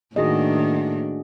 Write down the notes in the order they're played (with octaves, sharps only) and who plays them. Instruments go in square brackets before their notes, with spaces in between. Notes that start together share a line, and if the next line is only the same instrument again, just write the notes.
[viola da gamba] A2 D4 [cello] D#3 A#3 [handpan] F#4 G#4 D#5